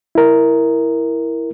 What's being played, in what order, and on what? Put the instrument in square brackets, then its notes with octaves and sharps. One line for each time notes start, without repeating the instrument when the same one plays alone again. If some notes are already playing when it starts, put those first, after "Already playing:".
[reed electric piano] E4 A#4